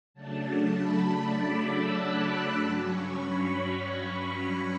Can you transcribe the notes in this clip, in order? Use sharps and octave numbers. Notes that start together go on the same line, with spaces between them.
C#3 F#3 A3 D4 A5
B5
D6
E6
F#6
G2 F#3 C#4
C#6
B5